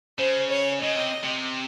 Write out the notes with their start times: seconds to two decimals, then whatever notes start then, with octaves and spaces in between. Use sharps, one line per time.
0.18 C#3 C5
0.50 C#5
0.82 C#3 D#5
0.96 C3
1.23 C3